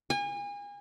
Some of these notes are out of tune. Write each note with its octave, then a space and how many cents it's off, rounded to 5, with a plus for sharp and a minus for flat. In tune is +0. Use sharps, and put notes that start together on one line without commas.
G#5 -35